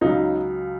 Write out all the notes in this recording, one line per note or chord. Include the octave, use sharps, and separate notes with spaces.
C#2 C#3 F#3 D#4